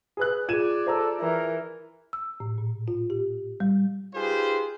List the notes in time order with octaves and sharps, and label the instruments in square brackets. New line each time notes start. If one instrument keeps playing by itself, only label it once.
[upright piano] G#4 B4 F#6
[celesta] F4 G#4 [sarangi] D5 [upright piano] G#6 D#7 E7
[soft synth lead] A4 [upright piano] C5 A#5 E6
[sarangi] E3 [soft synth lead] A#4
[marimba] E6
A2
A#2
F4
G4
G3
[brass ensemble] D#4 F4 G4 G#4 B4 C5